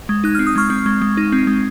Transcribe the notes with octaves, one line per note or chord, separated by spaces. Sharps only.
G#3
D#4 F#6
C4 F6
D#6
G#3 C#6 F6
C4
G#3
G#3
D#4
C4
G#3